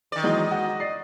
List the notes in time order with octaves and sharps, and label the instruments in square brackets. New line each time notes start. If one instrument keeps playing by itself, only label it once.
[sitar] D#3 D5
[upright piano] E3 F#3 G#3 [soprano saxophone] D#5
[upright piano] G#3 F#4
D5 C7